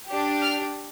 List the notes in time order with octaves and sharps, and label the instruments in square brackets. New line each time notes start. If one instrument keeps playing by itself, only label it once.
[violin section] D4 G4
F6